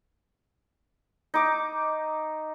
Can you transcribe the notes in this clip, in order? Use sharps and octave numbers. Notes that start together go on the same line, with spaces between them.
D#4 D6